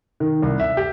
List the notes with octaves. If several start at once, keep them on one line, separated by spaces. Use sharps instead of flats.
D#3
C2
E5
G4